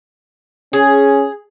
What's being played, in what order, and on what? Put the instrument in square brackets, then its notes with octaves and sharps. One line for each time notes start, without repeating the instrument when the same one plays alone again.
[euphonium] C#4 [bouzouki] G#4